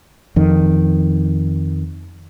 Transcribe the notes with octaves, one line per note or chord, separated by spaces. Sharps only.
F2 D#3